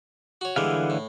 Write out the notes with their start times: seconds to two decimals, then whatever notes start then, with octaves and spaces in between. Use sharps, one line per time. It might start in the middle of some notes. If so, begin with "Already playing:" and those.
0.41 F#4 C#5
0.56 D3 E3 G3 G#3 B3 F5
0.90 A2